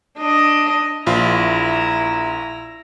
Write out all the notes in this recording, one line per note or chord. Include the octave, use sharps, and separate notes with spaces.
D4 D#5
A#1 E4 F4 A#5